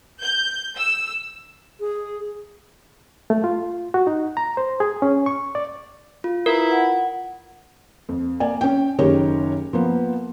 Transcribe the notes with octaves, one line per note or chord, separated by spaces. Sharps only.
G6
E6
G#4
A3
F4
F#4
D#4
A#5
C5
G#4
C#4
C#6
D5
F4
E4 A#4 B4 A#5
F#5
F2
A#3 D5 G#5
C#4 G5
F#1 D#3 G4 A#4 C#5
F3 A#3 B3